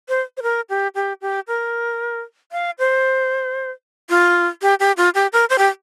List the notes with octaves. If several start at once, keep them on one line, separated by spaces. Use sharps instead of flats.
C5
C5
A#4
G4
G4
G4
A#4
F5
C5
F4
G4
G4
F4
G4
A#4
C5
G4